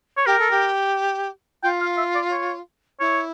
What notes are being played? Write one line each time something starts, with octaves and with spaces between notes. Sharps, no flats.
C#5
G4 A#4
A4
G4
F4 G5
F5
E5
D5
C#5
E4 C#5